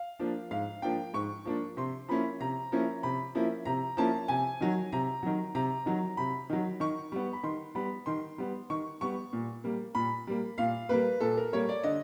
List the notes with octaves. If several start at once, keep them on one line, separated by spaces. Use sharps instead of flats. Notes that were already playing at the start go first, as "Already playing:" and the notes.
Already playing: F5
F3 A#3 D4
G#2 F5
F3 A#3 D4 G5
G#2 C#6
F3 A#3 D4
C3 C6
F3 A#3 C#4 E4 B5
C3 A#5
F3 A#3 C#4 E4
C3 B5
F3 A#3 C#4 E4
C3 A#5
F3 A#3 C#4 E4 A5
C3 G#5
D#3 F#3
C3 A#5
D#3 F#3
C3 A#5
D#3 F#3
C3 B5
D#3 F#3
D#3 C#6
G3 B3
B5
D#3 C6
G3 B3 B5
D#3 C6
G3 B3
D#3 C#6
G3 B3 C#6
A#2
G3 A#3
A#2 B5
G3 A#3
A#2 F5
G3 A#3 B4
A#2 A4
A#4
G3 A#3 C#5
D5
D3 D#5